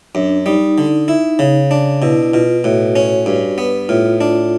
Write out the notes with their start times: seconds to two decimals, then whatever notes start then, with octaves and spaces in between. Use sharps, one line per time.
0.15 F#2 D4
0.46 G3 D#4
0.78 D3
1.08 E4
1.39 C#3
1.71 D4
2.02 B2 E4
2.23 E4
2.33 B2 F4
2.64 A2 F#4
2.96 C#4
3.26 G2
3.58 B3
3.89 A2 F4
4.20 D4 F4